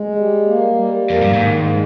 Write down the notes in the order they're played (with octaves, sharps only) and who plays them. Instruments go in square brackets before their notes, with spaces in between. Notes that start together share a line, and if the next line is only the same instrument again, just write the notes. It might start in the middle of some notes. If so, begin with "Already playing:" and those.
Already playing: [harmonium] G#3
G3
A#3
G3
A#3
[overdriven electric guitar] F2
G2
[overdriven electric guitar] G#2 [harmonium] D#3
[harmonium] G#3